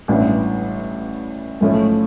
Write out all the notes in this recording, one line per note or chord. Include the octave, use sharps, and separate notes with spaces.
A1 G2 E3
B1 A2 F3 A3 C#4